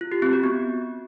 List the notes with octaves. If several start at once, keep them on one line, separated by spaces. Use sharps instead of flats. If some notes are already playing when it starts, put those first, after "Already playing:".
F4
G4
C4
F#4
B3